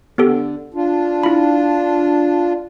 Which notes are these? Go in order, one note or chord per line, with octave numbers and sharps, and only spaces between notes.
D3 B3 G4 A4
D4 F4
E4 B5